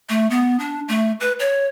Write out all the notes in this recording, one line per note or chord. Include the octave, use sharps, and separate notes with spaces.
A3
B3
D4
A3
B4
C#5